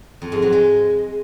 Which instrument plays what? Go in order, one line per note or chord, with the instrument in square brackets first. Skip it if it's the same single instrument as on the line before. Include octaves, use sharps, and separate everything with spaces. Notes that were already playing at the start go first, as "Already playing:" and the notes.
[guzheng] F2
G#2
F#3
G#3